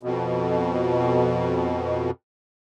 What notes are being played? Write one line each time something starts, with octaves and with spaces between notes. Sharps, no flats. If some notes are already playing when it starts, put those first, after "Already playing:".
F2 B2